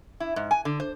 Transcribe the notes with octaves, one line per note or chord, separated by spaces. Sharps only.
E4
G#2
G#5
D3
C5